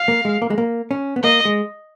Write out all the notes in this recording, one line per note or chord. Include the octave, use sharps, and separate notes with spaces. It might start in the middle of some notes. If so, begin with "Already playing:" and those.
Already playing: F5
A#3
G#3
A#3
G#3
A#3
C#4
B3
A#3 D#5
G#3